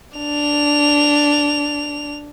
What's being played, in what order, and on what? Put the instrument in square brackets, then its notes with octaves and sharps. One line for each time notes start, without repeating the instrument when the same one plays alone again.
[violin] D4 F7